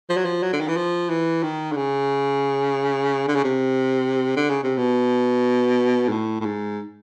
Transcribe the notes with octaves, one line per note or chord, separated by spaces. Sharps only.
F3
F#3
F3
F#3
D3
D#3
E3
F3
E3
D#3
D3
C#3
D3
C#3
C3
D3
C#3
C3
B2
G#2
A2
A2
G#2